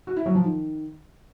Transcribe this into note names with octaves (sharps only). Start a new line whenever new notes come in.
F#4
E4
F#3
F3
D#3